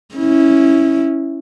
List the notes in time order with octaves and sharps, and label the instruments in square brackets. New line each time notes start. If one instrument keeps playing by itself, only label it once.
[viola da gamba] C#4 E4